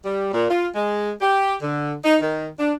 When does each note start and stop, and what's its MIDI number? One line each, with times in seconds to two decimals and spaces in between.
0.04 0.29 55
0.33 0.49 46
0.50 0.68 65
0.75 1.12 56
1.21 1.55 67
1.62 1.94 50
2.04 2.17 63
2.21 2.49 51
2.60 2.73 62